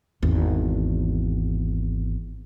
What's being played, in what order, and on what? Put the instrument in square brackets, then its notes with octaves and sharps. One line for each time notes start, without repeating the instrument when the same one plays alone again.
[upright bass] G#1 E2